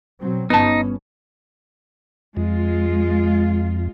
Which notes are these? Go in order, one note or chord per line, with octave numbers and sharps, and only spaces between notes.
B2 F#3 C4
G1 G3 B3 C#4 D#4 A5
F2 G#3 F4